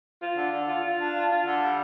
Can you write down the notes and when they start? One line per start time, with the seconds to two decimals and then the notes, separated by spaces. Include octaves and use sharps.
0.20 F4
0.36 D3
0.52 D3
0.67 F4
0.83 F4
0.99 D4
1.14 F4
1.30 F4
1.46 D3
1.61 G3